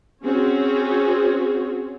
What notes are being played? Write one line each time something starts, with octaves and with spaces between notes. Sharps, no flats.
C4 C#4 F#4 G#4 C#5